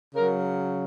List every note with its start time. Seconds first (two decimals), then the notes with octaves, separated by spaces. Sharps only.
0.15 C#3 F#3 A#4